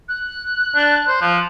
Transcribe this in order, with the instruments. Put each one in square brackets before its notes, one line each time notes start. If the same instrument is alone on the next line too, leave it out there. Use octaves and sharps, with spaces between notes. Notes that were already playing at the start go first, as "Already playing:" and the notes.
[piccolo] F#6
[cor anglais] D4
C5
F3